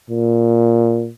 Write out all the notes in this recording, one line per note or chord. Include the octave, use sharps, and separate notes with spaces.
A#2